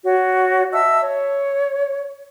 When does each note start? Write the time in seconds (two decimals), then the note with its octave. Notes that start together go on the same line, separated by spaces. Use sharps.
0.03 F#4 C#5
0.72 D#5 E5 A5 E6
1.02 C#5